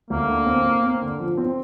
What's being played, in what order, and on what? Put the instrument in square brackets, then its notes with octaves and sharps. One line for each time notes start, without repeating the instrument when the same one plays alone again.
[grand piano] D2 [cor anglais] A#3
[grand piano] D3
C4
C4
C4
D3
F3
C4